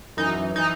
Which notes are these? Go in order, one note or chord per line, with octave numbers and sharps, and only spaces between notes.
F#2 E3 D#4
E3 D#4